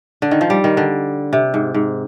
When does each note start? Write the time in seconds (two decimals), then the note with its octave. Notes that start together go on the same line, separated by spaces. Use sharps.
0.22 D3
0.31 D#3
0.41 F3
0.50 G3
0.64 D#3
0.77 D3
1.33 C3
1.54 G#2
1.74 G#2